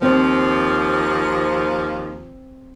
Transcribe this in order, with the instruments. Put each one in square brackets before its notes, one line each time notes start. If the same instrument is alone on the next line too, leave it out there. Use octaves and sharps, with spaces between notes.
[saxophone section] D#2 F3 [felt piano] C4